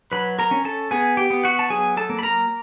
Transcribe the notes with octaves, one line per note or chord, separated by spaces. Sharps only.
F#3 B4 B5
A#4 A#5
C#4
A4 A5
B3 G#4 G#5
G4 G5
B3
F#4 F#5
A5
F#3 G#4 G#5
A4 A5
A#3
B5
A#4 A#5